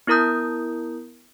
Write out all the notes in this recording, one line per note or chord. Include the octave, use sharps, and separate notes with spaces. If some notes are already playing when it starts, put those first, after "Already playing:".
B3 E4 A#4 A#5 D#6 G6